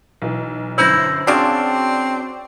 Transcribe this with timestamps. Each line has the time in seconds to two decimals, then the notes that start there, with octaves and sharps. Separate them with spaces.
0.22 B1 E3
0.78 G1 F#2 E4 C5 E6 G6 A#6
1.27 C#3 C4 D4 F#4 D5 F#5 C6